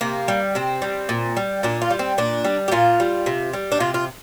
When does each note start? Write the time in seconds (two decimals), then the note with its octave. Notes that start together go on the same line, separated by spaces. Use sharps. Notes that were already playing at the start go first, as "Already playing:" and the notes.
0.01 C3 A#3
0.28 G3
0.55 C3 C4
0.82 G3
1.09 A#2
1.37 G3
1.63 A#2 D4
1.82 F4
1.90 G3
1.99 C4
2.18 A#2 D4
2.45 G3
2.68 G4
2.72 A#2 F4
3.00 G3
3.26 C3
3.53 G3
3.72 D4
3.80 C3 F4
3.94 F4